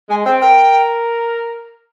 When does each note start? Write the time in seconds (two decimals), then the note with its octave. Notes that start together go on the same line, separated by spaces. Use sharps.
0.10 G#3 G#5
0.25 C4 G5
0.41 A#4 G5